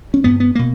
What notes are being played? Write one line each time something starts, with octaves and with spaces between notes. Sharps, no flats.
C#4
G2 B3
B3
B2 A#3